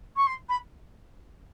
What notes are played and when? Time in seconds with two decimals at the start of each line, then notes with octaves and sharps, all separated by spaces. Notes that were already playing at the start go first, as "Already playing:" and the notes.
0.16 C#6
0.26 C6
0.49 B5